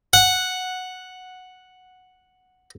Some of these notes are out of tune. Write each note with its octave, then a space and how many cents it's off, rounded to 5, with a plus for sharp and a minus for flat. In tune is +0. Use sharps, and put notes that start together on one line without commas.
F#5 -5